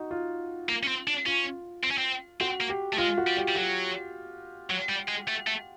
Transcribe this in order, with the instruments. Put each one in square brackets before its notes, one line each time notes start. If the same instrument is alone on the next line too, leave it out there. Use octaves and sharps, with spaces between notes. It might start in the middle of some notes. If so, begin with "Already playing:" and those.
Already playing: [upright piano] D#4 F#4
F4
[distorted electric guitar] A#3
C#4
C4
D4
[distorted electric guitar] C#4 [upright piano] F4
[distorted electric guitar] C4
C#4
C4
[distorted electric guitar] C4 [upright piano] F#4
[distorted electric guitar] A#3
[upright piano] G4
[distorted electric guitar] A3
[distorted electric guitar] G#3 [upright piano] F4
[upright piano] F#4
[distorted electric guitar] G3
[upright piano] G4
[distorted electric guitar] G3
[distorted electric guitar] F#3 [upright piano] F#4
[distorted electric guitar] F#3
G3
G#3
A3
A3